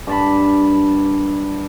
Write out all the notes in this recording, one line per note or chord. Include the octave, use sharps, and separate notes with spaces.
G2 A5 B5